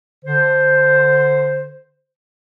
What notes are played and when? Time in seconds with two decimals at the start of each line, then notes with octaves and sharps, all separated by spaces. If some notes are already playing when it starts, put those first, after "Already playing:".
0.25 D3 C5